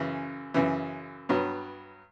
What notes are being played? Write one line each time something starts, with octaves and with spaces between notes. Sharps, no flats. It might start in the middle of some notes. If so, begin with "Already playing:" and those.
Already playing: F#2 C#3 E3
F#2 C#3 E3
G2 F#3 B3